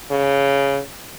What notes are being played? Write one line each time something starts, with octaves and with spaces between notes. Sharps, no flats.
C#3